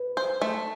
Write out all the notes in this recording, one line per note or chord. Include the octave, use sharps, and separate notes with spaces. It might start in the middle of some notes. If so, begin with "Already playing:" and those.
Already playing: B4
C5
A3